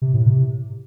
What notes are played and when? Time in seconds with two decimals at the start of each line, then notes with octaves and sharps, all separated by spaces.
0.02 C3
0.14 A2
0.25 C3